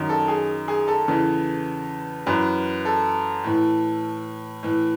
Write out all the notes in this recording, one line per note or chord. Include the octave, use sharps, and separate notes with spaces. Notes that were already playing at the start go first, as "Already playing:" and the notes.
Already playing: F#2 D#3
A4
G#4
G#4
A4
E2 C#3 E3
F#2 E3 B4
A4
A2 E3
A2 E3